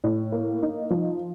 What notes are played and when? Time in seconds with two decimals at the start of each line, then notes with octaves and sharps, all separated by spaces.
0.04 A2
0.32 A#3
0.62 D#4
0.90 F3